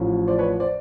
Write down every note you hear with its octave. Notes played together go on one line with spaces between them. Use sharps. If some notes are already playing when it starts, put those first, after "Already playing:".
Already playing: A1 A2 F3
C5 D5
B4 C#5
C5 D5